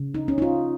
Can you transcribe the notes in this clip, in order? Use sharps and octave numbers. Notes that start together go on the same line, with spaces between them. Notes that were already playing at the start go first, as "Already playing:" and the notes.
Already playing: C#3
D#4
C#4
D#4
F4